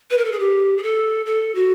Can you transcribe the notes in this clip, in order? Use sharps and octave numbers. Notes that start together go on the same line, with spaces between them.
B4
A#4
A4
G#4
G4
G#4
A4
A4
F#4